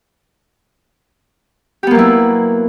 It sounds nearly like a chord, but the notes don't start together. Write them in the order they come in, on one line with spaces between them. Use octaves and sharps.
G4 B3 A#3 F#3 E4